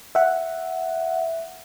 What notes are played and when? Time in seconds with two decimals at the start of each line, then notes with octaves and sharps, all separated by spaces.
0.15 E5 F#5